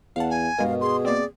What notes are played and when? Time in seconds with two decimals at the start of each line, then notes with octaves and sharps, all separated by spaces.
0.16 E2 F5 F#5 A5
0.30 G#5
0.59 G2 B2 G#3 A#4 F5
0.81 G#4 C6
1.05 A#3 C4 D5